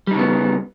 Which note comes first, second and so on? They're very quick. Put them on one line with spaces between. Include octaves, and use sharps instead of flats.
G3 D#4 C#3 B3